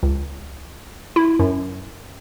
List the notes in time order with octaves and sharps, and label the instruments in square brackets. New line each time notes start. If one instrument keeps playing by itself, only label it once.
[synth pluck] C#2
E4
F#2